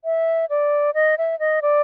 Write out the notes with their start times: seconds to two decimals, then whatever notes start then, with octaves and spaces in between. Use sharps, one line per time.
0.05 E5
0.50 D5
0.95 D#5
1.18 E5
1.39 D#5
1.62 D5